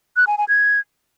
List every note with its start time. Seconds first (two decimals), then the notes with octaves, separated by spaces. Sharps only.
0.16 F#6
0.27 G#5
0.38 G#5
0.48 G#6